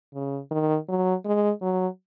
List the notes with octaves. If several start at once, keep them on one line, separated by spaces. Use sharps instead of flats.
C#3
D#3
F#3
G#3
F#3